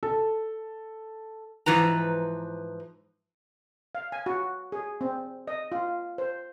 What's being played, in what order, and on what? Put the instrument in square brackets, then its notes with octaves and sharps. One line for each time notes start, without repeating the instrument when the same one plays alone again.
[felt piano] A4
[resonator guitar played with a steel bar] G#2 E3 F3 B4 A#5
[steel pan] F5
G#5
F#4
G#4
C4
D#5
F4
C5